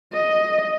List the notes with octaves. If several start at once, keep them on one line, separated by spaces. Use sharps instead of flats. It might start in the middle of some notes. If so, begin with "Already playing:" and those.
D#5